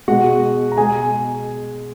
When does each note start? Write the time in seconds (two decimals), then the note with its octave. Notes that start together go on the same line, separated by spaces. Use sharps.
0.08 B2 G#3 F#4 F#5
0.72 A#5
0.77 B2 G#3 G#4 G#5